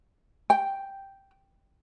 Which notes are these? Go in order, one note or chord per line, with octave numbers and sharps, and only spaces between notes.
G5